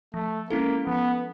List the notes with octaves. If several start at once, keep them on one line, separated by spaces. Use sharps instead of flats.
F3 A3
G#3 A#3 C#4 E4 A4
F3 B3